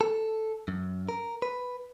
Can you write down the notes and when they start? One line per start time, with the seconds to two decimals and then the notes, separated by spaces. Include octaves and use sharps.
0.01 A4
0.68 F#2
1.09 A#4
1.42 B4